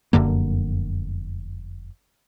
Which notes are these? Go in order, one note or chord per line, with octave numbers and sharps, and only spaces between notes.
F1 F#2 D3 A#3